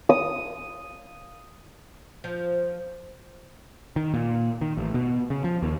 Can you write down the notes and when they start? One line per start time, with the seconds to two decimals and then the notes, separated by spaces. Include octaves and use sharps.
0.09 D#6
2.24 F3
3.96 D#3
4.14 A#2
4.61 D#3
4.77 A1
4.94 B2
5.30 C#3
5.44 F3
5.62 D#2